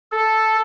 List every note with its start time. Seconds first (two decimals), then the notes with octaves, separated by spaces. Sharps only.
0.12 A4